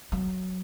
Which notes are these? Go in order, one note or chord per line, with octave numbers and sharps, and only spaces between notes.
F#3